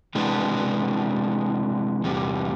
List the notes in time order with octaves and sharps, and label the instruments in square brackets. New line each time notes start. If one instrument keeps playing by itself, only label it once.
[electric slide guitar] C3 E3 G#3 B3 D4
E2 C3 G3